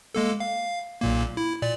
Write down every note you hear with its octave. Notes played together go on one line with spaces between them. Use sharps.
G#3 A#3 A4
F5
B1 A#2 A#3
E4
A#2 D5